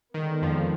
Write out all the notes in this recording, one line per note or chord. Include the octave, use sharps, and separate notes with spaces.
D3 D#3 G#3 B3
F2 F3